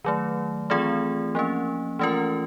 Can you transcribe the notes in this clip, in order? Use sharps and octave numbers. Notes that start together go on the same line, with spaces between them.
D#3 F#3 A3
E3 A3 C4 F4 G#4
F3 A#3 C#4
E3 A3 C#4 F4 A#4